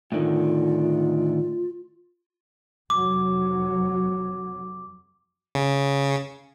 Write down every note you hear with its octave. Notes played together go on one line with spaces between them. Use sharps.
A2 D3 D#3 F4
F1 F#3 D6
C#3